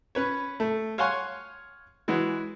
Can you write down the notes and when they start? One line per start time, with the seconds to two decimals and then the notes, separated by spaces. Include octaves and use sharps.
0.15 C#4 B4 C#5
0.60 A3
0.98 C#5 F5 F#5 G#5 C6 C#6
2.08 E3 G#3 F#4